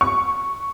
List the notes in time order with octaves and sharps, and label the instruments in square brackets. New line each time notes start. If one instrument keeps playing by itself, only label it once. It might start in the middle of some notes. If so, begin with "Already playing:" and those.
[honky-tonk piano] C#6